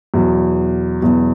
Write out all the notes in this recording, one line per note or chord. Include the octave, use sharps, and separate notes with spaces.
E2 B2 F#3
E2 B2 F#3